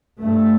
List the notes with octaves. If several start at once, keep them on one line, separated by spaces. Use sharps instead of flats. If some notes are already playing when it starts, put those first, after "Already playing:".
G2 A3